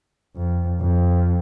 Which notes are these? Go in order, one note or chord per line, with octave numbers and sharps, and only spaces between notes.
F2
F2